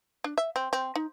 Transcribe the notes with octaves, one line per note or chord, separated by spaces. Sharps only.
D4
E5
C4
C4
D#4